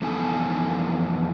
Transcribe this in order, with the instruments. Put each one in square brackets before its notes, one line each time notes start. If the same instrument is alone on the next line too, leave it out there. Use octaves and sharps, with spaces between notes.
[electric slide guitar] F2 E3 B3 D#4 A4 G#5